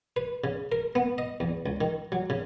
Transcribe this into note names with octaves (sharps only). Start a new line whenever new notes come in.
B4
C#3
A#4
B3
D#5
E2
C#2
D#3
F#3
C#3